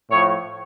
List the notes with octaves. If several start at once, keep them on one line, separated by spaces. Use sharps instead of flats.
A2 F3 C#5